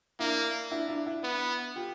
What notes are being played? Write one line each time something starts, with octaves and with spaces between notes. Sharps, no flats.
A#3 D4 E4
D4 E4
D4 E4
D4 E4
B3
F4 G4